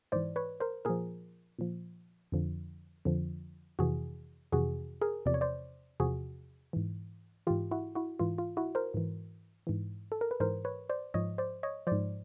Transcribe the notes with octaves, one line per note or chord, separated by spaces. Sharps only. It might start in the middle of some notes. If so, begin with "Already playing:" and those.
G#2 E3 C5 D5
B4 C#5
A#4 C5
A#2 F3 G#4 A#4
A#2 F3
F2 D3 F3
F2 D3 F3
F2 C3 E3 F#4 G#4
F2 C3 E3 F#4 G#4
G#4 A#4
E2 C3 F3 D5
C#5
C5 D5
E2 C3 F3 F#4 G#4
G#2 E3
G#2 E3 F4 G4
E4 F#4
E4 F#4
G#2 E3 F4
F4
E4 F#4
A#4 C5
G#2 E3
G#2 E3
A4
A#4
B4
G#2 E3 A#4 C5
B4 C#5
C5 D5
G#2 F3 C#5 D#5
C5 D5
C#5 D#5
G#2 F3 C5 D5